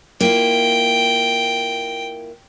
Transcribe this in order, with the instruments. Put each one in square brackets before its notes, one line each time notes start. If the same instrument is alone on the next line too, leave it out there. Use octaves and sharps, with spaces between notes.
[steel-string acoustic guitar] A#3 E4 F4 [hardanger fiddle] G5